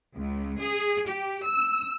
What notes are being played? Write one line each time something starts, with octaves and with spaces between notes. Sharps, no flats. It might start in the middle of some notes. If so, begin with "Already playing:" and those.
C#2
G#4
G4
E6